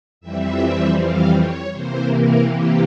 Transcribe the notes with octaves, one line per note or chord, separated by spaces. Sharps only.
F2 E3 G3 C4 E5
F5
C#5
C3 E3 A#3 C5
A#4
G4